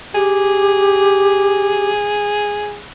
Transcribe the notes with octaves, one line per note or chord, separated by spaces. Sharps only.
G4 G#4